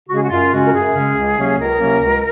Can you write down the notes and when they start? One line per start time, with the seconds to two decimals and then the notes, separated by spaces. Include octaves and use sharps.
0.08 C#3 G#3 C#4 F#4
0.15 G#4
0.23 F#4
0.30 F#2 F4
0.51 C#3 G#3 C#4 F#4
0.67 A#4
0.73 F#2 G#4
0.94 C#3 G#3 C#4
1.15 C#2
1.37 C3 F#3 A#3 C#4
1.58 C#2 A#4
1.79 C3 F#3 A#3 C#4
2.00 C#2